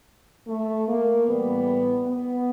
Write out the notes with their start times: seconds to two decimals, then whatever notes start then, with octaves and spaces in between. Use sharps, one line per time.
0.48 A3
0.88 A#3
1.27 A2 E3 G3 B3
2.07 B3